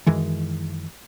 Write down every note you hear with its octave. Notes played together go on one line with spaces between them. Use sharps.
F#2 D#3 E3 G#3